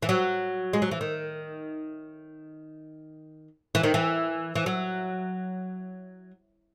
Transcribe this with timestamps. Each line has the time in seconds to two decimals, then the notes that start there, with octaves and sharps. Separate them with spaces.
0.02 E3
0.09 F#3
0.73 G#3
0.82 F#3
0.91 E3
1.01 D#3
3.75 E3
3.83 D#3
3.94 E3
4.56 E3
4.66 F#3